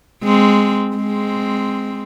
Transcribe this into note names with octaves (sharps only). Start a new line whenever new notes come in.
G#3 C4
G#3 C4